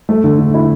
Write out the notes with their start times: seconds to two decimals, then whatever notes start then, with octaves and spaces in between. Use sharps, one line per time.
0.09 A3
0.24 D3
0.39 D3
0.54 E4